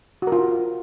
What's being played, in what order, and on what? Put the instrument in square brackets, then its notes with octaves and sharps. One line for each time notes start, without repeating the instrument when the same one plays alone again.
[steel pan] F#4
A#4
F4